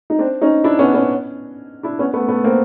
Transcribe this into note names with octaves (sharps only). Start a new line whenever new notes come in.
D#4
C4 D4
C#4 D#4
D4 E4
B3 C#4
B3 C#4
D4 E4
B3 C#4
A3 B3
A3 B3
A#3 C4